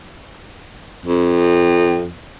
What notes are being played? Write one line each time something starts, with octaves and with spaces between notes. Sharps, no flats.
F2